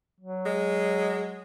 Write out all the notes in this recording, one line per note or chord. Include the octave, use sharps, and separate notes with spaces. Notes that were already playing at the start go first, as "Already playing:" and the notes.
F#3
G#3